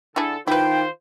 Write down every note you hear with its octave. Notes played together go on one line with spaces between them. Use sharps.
D3 D4 E4 G#4 A4
D#3 E4 F4 B4 C5 G5